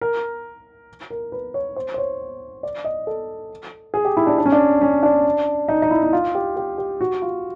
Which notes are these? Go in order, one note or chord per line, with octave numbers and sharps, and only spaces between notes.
A#4
A#4
B4
C#5
C5
C5
C#5
D5
D#5
A4
G#4
G4
E4
D4
D4
C#4
D4
C#4
D4
D#4
D#4
E4
E4
F4
G4
G4
G4
F#4
F4